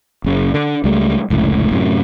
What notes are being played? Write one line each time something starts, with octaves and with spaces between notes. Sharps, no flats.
F#1 C#3
D3
C#2 G3 A3
F1 C#2 A2
F#2 A2 C3